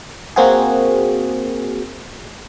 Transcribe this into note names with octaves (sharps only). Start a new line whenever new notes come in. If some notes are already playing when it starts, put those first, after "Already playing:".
A#3 C4 F#4 G#4